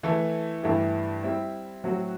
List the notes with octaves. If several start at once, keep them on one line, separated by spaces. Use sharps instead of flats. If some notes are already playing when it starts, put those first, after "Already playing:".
E3 A3 E4 A4
G2 E3 A3 E4 G4
G3 C4 E4
A2 F#3 C4 F#4